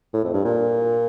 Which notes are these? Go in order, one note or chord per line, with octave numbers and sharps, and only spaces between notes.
A2
F2
G2
A#2